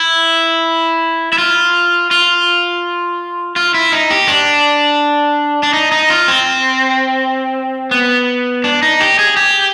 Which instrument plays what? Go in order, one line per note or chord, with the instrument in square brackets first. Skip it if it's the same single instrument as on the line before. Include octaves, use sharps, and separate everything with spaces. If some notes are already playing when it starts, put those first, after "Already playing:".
Already playing: [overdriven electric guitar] E4
E4
F4
F4
F4
E4
D#4
G4
D4
D4
D#4
D#4
F4
C4
B3
D4
D#4
G4
G#4
G4